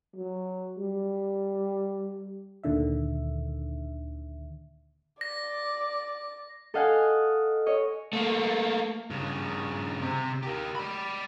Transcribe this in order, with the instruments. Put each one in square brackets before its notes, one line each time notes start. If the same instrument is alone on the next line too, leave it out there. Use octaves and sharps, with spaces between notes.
[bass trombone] F#3
G3
[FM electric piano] D2 A#2 D3 D#3 E5
[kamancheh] D5 [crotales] A#6
[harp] A4 D#5 F5 F#5 G#5
C#5 D#5
[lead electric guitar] A3 A#3
G2 C#3
C3
G4 A#4
D5 B5